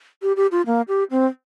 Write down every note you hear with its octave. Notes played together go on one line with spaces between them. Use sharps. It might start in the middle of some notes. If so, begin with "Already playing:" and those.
G4
G4
F4
A#3
G4
C4